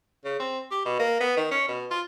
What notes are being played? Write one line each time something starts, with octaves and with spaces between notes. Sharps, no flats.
C#3
C4
G4
B2
A#3
B3
D#3
C#4
B2
F4